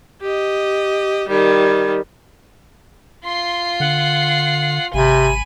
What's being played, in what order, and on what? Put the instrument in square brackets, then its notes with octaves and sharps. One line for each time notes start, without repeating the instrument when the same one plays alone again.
[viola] G4 D#5
D#3 G3
[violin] F4 C7 [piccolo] C6
[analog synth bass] D3 [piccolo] F#5
[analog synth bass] G#1 [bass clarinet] C3 [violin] G#5 B5 [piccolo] D#7